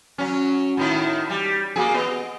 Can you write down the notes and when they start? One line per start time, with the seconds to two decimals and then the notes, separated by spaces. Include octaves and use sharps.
0.18 F#3 C#4
0.77 A2 D#3 E4
1.30 G3
1.76 A#3 F#4 G#4
1.94 B3 D#5